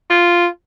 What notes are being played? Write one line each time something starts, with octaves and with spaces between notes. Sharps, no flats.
F4